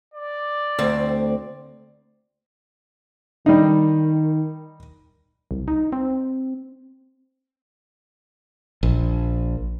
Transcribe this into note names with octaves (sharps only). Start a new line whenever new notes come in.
D5
D2 C4
D#3 G3 D#4
C2
D#4
C4
A#1